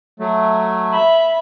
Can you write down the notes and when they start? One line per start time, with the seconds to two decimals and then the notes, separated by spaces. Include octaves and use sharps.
0.20 F#3 A3
0.93 E5 B5